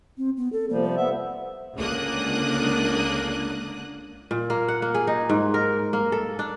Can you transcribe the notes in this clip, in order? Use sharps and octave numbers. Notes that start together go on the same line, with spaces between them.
C4
B3
A4
C3 F3 G3 A#3
C5
B3 E5
C#2 D3 A#3 D4 D#6 F#6
A#2
A#3
F#5
A#3
G#4
D#4
G#2
A#4
A#3
A4
D4